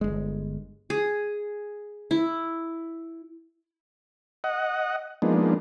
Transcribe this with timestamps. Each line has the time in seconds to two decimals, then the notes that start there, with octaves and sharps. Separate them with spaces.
0.01 G1 G#3
0.90 G#4
2.11 E4
4.44 D#5 F#5
5.22 F3 G#3 A#3 B3 D4 D#4